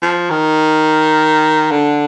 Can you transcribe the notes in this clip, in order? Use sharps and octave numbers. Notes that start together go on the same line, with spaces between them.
F3
D#3
D3